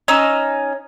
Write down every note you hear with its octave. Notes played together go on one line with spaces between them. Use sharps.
C#4 D#4 E6